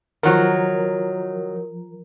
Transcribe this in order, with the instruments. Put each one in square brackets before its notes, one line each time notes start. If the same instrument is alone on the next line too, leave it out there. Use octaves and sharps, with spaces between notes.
[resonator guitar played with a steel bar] D#3 F#3 [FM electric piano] F3 A#4